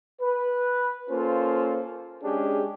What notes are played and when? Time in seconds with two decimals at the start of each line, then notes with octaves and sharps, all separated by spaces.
0.21 B4
1.09 A#3 C#4 F4 A4 C5
2.23 G#3 C#4 D4 G4 G#4